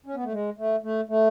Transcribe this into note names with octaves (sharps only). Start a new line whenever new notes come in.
C#4
B3
A3
G#3
A3
A3
A3